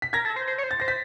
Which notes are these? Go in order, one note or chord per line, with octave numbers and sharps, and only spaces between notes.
B6
A#4 G#6 A#6
A4
C5
C5
C#5
C5
A6
C5 A#6
B6